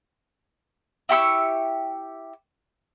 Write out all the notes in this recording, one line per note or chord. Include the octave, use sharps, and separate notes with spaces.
E4 G4 C#6 E6